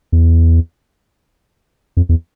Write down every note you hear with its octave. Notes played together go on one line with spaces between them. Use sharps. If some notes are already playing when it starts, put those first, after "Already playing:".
E2
F2
E2